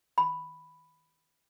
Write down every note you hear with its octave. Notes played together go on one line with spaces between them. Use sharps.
B5